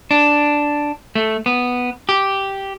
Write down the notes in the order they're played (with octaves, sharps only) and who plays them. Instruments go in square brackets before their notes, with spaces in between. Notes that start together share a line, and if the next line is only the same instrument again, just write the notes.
[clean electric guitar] D4
A3
B3
G4